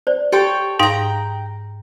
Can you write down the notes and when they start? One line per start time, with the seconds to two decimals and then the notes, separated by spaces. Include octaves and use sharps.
0.07 C5 D5
0.32 G4 A4 C#5 G5 C6 C#6
0.79 G#2 D#4 F5 G5 A#5